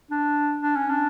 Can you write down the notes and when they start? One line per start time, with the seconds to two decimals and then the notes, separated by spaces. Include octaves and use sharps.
0.11 D4
0.61 D4
0.76 C#4
0.90 D4